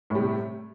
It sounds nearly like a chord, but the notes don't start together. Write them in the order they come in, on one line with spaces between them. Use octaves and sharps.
A2 G3 C3